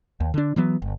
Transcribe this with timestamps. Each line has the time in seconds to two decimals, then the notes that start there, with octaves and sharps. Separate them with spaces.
0.20 D#2
0.34 D3 D4
0.56 E3 F#3 B3
0.82 G1